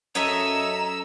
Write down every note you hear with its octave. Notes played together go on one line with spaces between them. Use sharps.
F#2 A4 C#5 D#5 E5 A#5 E6